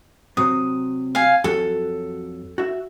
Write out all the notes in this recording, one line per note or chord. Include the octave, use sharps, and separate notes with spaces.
C3 F#3 C4 D#6
F5 G#5
F2 F#3 A4
F#4 E5